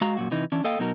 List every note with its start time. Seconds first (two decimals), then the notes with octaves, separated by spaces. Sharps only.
0.01 G#3 F#4 F5 A#5
0.17 F#2 A#2 F#4
0.31 C3 E3 D#4
0.52 E3 C#4 D4
0.64 A#3 A4 D#5 F5 G5
0.79 B2 F#3 D#4 F#4 A#4